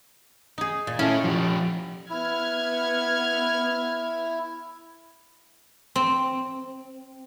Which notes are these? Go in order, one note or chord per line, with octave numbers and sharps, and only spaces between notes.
D#4 G#4
A#2
C#4 E4 A4
F3 G4
B3 E4 F6 G#6
C4